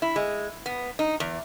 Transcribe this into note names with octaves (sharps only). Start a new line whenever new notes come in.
E4
G#3
B3
D#4
E2